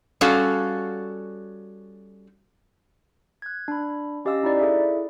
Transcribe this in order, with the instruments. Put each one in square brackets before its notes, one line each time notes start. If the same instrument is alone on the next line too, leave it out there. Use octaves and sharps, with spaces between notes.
[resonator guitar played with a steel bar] G3 C#4 F#4 A4 F5
[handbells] F#6 G#6
D4 B5
C#4 G4 D#5 F5 E6
D#4 E4 D5
E4 G#4 A4 E5